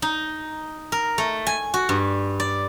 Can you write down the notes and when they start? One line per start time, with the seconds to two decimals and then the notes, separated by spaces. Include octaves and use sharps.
0.02 D#4
0.92 A#4
1.18 A3
1.47 G#5
1.74 F#4
1.89 G2
2.40 D5